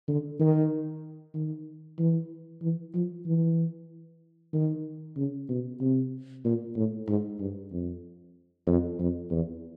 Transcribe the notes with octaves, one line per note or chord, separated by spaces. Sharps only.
D3
D#3
D#3
E3
E3
F3
E3
D#3
C#3
B2
C3
A#2
A2
G#2
G2
F2
F2
F2
E2